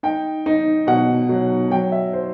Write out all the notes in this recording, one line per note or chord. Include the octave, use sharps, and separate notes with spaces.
D#4 G5
D#4
B2 F#5
F#3
F#3 G5
E5
C5